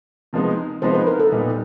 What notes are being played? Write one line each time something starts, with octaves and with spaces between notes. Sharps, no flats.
C3 F3 G#3 B3 D#4
C3 F3 G#3 B3 D#4 C5
B4
A#4
A4
A#2 G3 B3 D#4